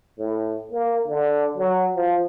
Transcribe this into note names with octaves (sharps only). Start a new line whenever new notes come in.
A2
A#3
D3
F#3
F3